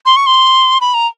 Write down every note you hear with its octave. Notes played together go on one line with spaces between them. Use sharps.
C6
C#6
C6
B5
A#5